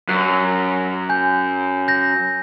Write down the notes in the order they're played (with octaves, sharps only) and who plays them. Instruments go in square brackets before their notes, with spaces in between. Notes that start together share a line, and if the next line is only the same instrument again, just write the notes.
[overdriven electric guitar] F#2 [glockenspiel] F#6
[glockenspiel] G#5 G6
G6 A#6